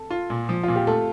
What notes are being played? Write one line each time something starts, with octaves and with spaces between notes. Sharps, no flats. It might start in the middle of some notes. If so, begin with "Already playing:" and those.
Already playing: A4
F4
A#2
F3
A#2 F4
G4
A3 A4